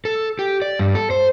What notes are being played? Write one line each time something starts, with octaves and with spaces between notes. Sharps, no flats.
A4
G4
D5
G2
A4
C5